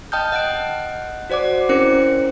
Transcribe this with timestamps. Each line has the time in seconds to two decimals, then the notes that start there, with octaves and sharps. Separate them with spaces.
0.12 D#5 G5 A5 D#6 F6 G6
0.32 D#5 F#5 F#6 D7
1.30 F#4 C5 D5 F#5 D6
1.69 C4 C#4 E4 A#4 C5 C#7